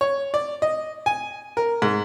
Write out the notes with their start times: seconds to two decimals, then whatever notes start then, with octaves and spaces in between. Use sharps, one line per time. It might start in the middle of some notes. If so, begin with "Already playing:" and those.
0.01 C#5
0.34 D5
0.62 D#5
1.06 G#5
1.57 A#4
1.82 G#2